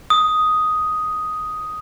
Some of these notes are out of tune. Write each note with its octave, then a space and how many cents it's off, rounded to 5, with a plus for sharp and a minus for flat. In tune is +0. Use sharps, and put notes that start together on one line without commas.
D#6 +5